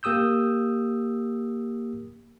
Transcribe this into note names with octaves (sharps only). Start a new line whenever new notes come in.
A#3 G4 D#6 E6 G6